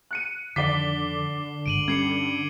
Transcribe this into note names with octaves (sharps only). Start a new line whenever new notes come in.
F#6 C#7 D#7
F2 D3 D#3 D5 D6 B6 C7 G7
G1 C#2 G#2 D7 D#7 F#7
G2 C#4 G#6 C7 C#7